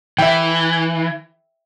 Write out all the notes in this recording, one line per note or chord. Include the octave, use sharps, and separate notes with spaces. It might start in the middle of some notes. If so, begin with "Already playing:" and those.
E3 E5 G5